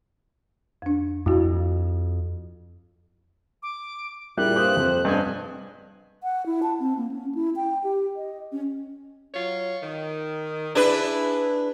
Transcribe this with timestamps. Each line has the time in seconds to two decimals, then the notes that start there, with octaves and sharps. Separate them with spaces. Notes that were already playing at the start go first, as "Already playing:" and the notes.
0.82 F2 D4
1.26 F2 E4 F#4
3.63 D6
4.38 A#2 G3 E4 G#4 A#4 F#6
4.56 G2 A#3 G4 C5 D#6 G6
4.77 F2 C5
5.05 G2 C3 B3 C4 D4 D#5 G#5
6.23 F#5
6.46 E4
6.63 A5
6.80 C4
6.97 A#3
7.11 C#4
7.35 E4
7.56 G5
7.84 G4
8.16 D#5
8.52 C#4
9.34 F#3 F4 C#5
9.83 D#3
10.75 D4 E4 G#4 B4